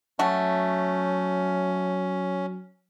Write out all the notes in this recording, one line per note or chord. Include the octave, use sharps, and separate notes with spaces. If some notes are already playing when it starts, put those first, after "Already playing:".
F#3 A3 C#4 F#4